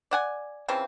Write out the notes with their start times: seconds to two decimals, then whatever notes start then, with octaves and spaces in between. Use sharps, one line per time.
0.11 D5 F#5 G#5
0.68 C#3 E3 F3 C4